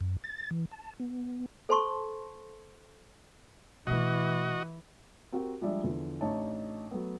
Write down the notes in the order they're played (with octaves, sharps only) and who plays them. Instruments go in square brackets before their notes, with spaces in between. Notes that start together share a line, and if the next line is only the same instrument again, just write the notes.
[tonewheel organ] F#2
A6
E3
A5
B3
[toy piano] A4 C5 A5 C6 C#6
[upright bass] B2 A3 [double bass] E3 [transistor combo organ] F#4 D#5
[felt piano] C4 F#4 G4 A#4 F#5
F3 G3 G#3 D4 D5 E5
E2 D3 E3 F3
A1 D4 D#4 C#5 A5
F#3 A3 B3